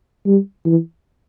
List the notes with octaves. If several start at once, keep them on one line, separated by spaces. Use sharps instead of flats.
G3
E3